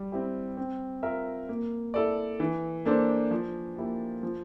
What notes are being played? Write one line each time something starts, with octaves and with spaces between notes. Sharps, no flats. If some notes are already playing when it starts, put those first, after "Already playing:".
Already playing: G3
C4 E4 G4
C4
F4 A#4 E5
A#3
E4 A4 D5
E3
A#3 D4 A4 C5
F3
A#3 E4 G4
F3